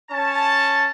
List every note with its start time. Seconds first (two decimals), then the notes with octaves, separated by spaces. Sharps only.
0.11 C#4 A5